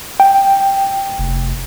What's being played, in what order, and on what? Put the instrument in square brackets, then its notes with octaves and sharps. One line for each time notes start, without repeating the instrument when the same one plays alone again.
[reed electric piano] G5
[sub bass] F1